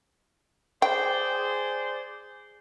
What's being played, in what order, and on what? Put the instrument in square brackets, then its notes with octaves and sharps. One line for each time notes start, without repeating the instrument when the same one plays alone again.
[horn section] G#4 C5 D5 [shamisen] G5